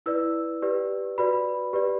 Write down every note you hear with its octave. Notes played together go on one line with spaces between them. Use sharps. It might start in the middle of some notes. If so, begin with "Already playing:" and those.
E4 B4 D5 E6
G4 B4 D5
F#4 B4 D5 B5
G4 B4 D5